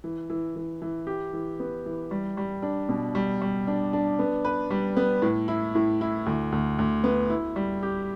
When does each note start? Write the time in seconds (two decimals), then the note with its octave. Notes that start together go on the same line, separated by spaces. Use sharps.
0.04 E3
0.30 E3
0.56 E3
0.82 E3
1.07 G4
1.33 E3
1.60 B3
1.86 E3
2.11 G3
2.37 G3
2.62 D4
2.89 B2
3.15 G3
3.42 G3
3.67 D4
3.93 D4
4.19 B3
4.45 B4
4.71 G3
4.97 B3
5.22 A2
5.48 E4
5.75 A2
6.01 E4
6.26 D2
6.52 D2
6.79 D2
7.04 B3
7.30 E4
7.56 G3
7.83 G4